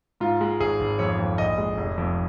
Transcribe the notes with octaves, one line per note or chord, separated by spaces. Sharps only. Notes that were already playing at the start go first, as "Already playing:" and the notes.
G#2 F4
G#3
G#1 G#4
G#1
F2 C#5
F2
A#1 D#5
G#3
F1
F2